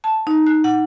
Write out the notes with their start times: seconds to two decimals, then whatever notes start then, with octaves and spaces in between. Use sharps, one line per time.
0.04 A5
0.27 D#4
0.47 F#6
0.64 F#5